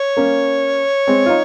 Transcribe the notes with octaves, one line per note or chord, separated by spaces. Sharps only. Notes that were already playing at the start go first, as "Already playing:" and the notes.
Already playing: C#5
A#3 C#4
G#3 C4
F4
D#4